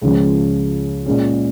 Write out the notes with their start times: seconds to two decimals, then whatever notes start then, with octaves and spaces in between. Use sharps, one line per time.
0.02 C#2 C#3 F3 C#4
1.06 A#2 G#3 C#4